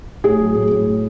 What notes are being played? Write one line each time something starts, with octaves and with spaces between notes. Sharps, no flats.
A2 G#4
F#3
A2
A2